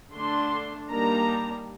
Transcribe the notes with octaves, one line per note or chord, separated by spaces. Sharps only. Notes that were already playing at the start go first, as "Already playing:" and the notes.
D3 A3 D4 C6
D#3 G3 A#3 D4 A#5